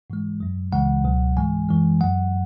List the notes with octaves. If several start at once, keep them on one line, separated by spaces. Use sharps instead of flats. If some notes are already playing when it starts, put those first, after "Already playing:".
G#2 E3 G#3
F#2 F#3
C#2 C#3 E3 G#3 F#5
C#2 B2 F#3
G#2 E3 G#3 G#5
F#2 E3 G#3
F#2 F#3 F#5